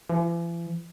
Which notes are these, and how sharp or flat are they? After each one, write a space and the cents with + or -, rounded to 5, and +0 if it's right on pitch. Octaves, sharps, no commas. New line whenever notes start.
E3 +45